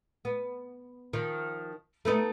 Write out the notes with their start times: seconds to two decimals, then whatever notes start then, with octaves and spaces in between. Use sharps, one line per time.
0.25 B3
1.13 D#3 F3
2.05 A3 B3 D#4